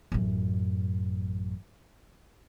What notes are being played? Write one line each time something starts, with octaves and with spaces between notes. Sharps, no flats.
A1 F#2